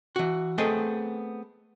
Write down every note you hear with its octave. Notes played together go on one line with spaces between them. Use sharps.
E3 F#4
A3 B3 C4 G#4 D#5